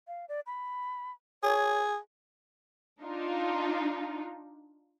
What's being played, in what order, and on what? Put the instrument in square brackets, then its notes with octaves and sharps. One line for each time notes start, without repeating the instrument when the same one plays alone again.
[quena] F5
D5
B5
[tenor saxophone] G#4 [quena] C#5
[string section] D4 D#4 F4